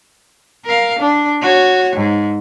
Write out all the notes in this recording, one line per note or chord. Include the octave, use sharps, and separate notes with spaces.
A#4 F5
D4
F#4 C#5
G#2